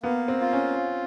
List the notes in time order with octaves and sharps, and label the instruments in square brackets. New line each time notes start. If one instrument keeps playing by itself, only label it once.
[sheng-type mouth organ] A#3 [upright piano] B3
[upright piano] C4
[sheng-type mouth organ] F4
[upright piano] C#4